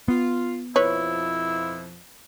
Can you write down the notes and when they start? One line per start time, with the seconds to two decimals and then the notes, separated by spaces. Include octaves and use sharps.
0.08 B3 F4
0.76 F2 B2 F3 E4 B4 C#5